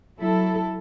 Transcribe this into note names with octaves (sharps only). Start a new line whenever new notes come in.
F#3 E4 A4